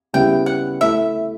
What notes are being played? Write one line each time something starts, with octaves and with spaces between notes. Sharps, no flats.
C#3 G3 B3 E4 G5
F#5
A3 E4 E5